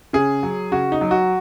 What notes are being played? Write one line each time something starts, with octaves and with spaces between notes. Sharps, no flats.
C#3 G#4
F#3
C#3 F#4
D#4
F#3
F#4